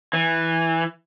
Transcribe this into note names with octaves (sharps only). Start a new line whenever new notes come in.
E3